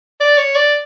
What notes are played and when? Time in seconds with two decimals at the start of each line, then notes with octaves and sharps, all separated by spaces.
0.20 D5
0.37 C#5
0.55 D5